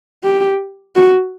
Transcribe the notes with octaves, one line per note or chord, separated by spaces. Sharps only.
G4
F#4